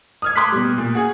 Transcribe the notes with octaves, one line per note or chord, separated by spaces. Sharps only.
D#6 F6 G#6
C6 D6 D#6 F#6 B6
B2 G3
A#2
F#4 G#4